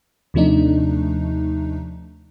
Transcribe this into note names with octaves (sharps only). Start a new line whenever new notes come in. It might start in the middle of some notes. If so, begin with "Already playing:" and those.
D#2 C3 F3 A3 D4 D#4